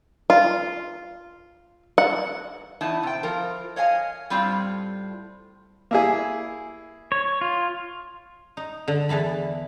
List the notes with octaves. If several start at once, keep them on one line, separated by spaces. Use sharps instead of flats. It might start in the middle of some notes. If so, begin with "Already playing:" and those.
F4
F#5
E2 D#4 E4 A5
C3 G5
F3 F4 A#4
C#5 D#5 F5 G#5
A2 G3 C4 F4
A#3 E4 G#4
C#5
F4
D#4
D3
E2 E3 A5 B5